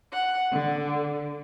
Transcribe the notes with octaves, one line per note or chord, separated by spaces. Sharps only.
F#5
D3